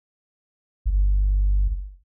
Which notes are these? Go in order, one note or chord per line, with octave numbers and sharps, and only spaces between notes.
G1